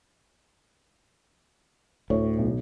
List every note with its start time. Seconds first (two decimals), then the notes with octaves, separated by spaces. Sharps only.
2.10 D2 A2 C#5
2.38 B1